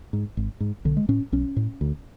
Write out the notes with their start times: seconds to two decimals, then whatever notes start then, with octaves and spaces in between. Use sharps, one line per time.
0.13 G#2
0.37 G#1
0.60 G#2
0.85 B1 D3
0.97 G#3
1.09 A2 C#4
1.32 B1 C#4
1.56 A2
1.81 D2